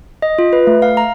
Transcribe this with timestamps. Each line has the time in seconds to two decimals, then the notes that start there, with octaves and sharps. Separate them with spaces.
0.22 D#5
0.39 F4
0.53 B4
0.67 A3
0.82 F5
0.97 A#5